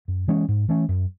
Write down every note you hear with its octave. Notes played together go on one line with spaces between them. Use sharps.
F#2
E3 G#3 C#4
G#2
E3 A3 C#4
F#2